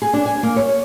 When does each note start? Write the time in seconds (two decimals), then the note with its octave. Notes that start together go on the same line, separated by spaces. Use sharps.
0.02 G#4
0.13 D4
0.26 G#5
0.43 A#3
0.56 C#5